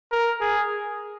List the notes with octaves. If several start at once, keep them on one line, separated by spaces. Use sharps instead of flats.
A#4
G#4